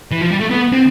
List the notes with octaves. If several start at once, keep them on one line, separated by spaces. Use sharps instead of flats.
E3
F3
G3
A3
B3
C4